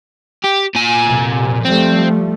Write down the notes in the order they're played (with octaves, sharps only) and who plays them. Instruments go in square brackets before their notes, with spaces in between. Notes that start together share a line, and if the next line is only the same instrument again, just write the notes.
[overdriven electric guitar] G4
A#2 G#5
[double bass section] F2 C3
[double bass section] F3 G3 A3 [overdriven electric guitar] C4